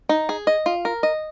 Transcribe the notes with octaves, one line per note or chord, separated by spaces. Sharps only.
D#4
G#4
D#5
F4
A#4
D#5